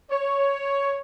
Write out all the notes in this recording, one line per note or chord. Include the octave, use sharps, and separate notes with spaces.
C#5